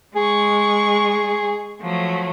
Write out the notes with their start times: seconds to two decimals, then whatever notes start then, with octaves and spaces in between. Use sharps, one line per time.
0.16 G#3 G#4 C#6
1.80 F3 F#3 A3